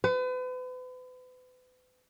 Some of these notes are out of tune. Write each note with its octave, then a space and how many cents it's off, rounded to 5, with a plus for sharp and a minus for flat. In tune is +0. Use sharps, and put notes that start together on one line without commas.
B4 +40